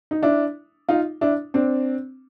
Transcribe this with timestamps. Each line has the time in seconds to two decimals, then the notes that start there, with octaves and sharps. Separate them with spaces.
0.11 D#4
0.23 D4 E4
0.89 D#4 F4
1.21 D4 E4
1.54 C4 D4